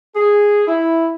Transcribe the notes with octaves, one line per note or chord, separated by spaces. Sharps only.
G#4
E4